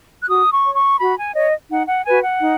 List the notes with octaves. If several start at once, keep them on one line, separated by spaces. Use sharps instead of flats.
F#6
F#4 D#6
C#6
C#5
C#6
F#4 B5
G#5
C#5 D#5
D#4 F#5
F#5
F#4 B4 G#5
F#5
D#4